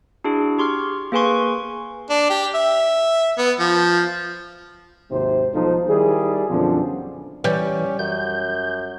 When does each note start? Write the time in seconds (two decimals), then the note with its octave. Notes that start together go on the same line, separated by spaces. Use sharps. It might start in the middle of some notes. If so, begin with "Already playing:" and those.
0.24 D4 E4 F#4 G#4
0.58 G4 C6 C#6 F6
1.12 A#3 G#4 B4 G#5 C6 C#6
2.10 D4
2.30 G4
2.55 E5
3.38 B3
3.59 F3
5.11 G#1 D#2 G#2 C3 C5
5.54 B1 F3 D#4 A4 C5
5.89 D#3 G3 E4 G#4
6.50 F#2 B2 D3 F3 C4 C#4
7.44 E3 G3 C#4
7.99 F#2 G6